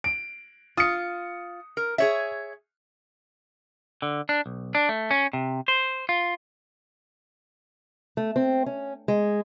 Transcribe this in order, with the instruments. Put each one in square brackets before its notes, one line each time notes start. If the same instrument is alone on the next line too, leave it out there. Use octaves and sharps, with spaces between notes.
[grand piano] D7
[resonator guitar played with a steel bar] F4 [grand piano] D#6 C#7
[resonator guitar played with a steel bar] A#4
G#4 C#5 E5
[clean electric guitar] D3
D4
B1
D4
A3
C#4
C3
C5
F4
[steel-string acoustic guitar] A3
C4
C#4
G#3